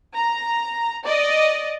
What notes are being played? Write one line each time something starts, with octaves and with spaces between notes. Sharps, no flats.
A#5
D5 D#5